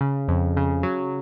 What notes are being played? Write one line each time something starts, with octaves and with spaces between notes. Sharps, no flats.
C#3
F2
C#3
F#3